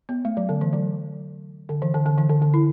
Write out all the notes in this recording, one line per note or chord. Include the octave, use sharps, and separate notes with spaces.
B3
A3
F#3
D3
E3
F#3
D3
E3
D3
D3
E3
D3
D3
E4